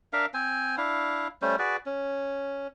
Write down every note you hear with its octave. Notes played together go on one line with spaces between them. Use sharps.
D4 A#4 E5 F5
C4 C5 G#5
D4 E4 F5
G3 A3 C#4 C5
F#4 G#4 B4 D5
C#4